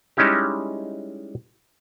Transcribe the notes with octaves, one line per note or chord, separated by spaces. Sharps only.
G3 G#3 C#4 D#4 E4 G4